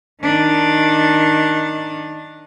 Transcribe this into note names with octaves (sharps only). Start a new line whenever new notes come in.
D#3 D4